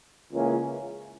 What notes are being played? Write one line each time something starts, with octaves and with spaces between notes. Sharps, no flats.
C#2 C#3 E3 A#3 C#4